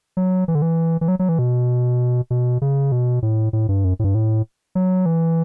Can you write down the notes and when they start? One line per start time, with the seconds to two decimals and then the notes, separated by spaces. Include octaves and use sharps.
0.17 F#3
0.48 E3
0.55 D3
0.62 E3
1.01 E3
1.08 F#3
1.19 F#3
1.29 E3
1.39 B2
2.30 B2
2.62 C#3
2.92 B2
3.22 A2
3.53 A2
3.69 G2
3.84 F#2
3.99 A2
4.04 G2
4.15 A2
4.75 F#3
5.06 E3